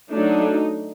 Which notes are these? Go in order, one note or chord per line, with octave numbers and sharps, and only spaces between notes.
F#3 A3 D4 D#4